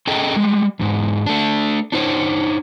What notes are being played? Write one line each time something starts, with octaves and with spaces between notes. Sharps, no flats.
C#4 G#4 A4 D#5 G5 A#5
G3 G#3
E2 G#2
A3 D4
D4 D#4 C5 C#5